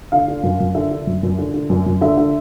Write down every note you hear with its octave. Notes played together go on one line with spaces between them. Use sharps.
D3 F5
D3
F#2
F#2
D3 E5
D3
F#2
F#2
D3
D3
F#2
F#2
D3 E5
D3